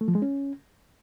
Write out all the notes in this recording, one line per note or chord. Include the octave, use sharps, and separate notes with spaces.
A3
F3
G#3
C#4